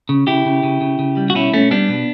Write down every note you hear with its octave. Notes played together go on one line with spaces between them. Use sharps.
C#3
C#3 E4 G4
C#3
C#3
C#3
C#3
G3
F#4
B2 C#4 E4
B2 A3 C#4
G3 B3 D4
B2